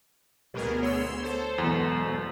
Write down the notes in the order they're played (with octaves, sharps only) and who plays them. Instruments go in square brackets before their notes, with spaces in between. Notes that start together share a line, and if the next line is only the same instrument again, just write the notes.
[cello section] D2 B3 G#4 [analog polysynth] B2 A#4
[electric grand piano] C#5 [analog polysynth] C6 E6
[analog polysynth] A4 C5
[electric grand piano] E2 [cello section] G#2 B2 F#3